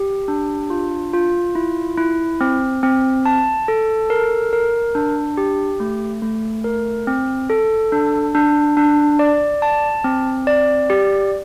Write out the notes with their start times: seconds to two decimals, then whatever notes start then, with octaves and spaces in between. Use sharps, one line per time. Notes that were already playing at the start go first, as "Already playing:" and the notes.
Already playing: G4
0.28 D4
0.70 F4
1.13 F4
1.55 E4
1.97 E4
2.41 C4
2.83 C4
3.26 A5
3.68 A4
4.10 A#4
4.53 A#4
4.95 D4
5.37 G4
5.80 A3
6.22 A3
6.64 A#4
7.07 C4
7.50 A4
7.92 D4
8.35 D4
8.77 D4
9.19 D5
9.62 A5
10.04 C4
10.47 D5
10.90 G4